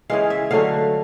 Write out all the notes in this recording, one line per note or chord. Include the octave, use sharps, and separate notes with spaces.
C#3 E3 G#3 F5
E5
D3 F#3 A3 F5